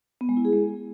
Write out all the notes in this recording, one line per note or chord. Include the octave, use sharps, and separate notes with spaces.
B3
G#3
E4
G#4
G#3